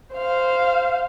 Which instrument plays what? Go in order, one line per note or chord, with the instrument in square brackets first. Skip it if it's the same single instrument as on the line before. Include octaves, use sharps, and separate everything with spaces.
[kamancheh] C5 F5